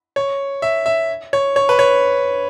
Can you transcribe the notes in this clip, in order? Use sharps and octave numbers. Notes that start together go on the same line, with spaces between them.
C#5
E5
E5
C#5
C#5
B4
C#5